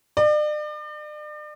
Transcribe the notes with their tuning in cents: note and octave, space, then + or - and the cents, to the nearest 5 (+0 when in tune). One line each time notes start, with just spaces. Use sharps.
D5 +40